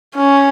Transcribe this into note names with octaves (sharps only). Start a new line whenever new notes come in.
C#4